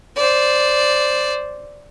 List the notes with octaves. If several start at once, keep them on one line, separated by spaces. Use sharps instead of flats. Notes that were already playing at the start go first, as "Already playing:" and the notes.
C5 D5